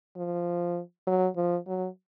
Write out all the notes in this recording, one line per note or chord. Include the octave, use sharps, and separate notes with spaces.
F3
F#3
F3
F#3